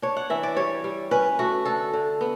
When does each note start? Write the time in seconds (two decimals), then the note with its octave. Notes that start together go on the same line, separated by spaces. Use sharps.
0.02 D4 C#5
0.17 F#5
0.30 E3 E5
0.43 D5
0.57 G3 C#5
0.84 G3
1.11 C#4 B4
1.39 A3 F#4
1.65 D3 A4
1.93 D3
2.21 B3